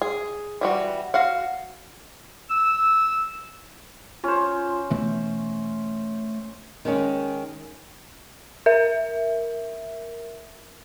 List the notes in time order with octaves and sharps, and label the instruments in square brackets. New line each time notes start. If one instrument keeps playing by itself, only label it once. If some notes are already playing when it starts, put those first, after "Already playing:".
[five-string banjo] G#4
E3 G3 F#4
F#4 F5 F#5
[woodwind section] E6
[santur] C#4 C5 [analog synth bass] F4
[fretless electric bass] B2 E3 B3 [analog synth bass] A3
[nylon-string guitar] D#3 G#3 C#4
[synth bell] A#4 E5